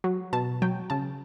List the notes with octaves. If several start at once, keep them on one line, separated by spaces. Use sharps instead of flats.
F#3
B2 A5
F#3 G5
C#3 A5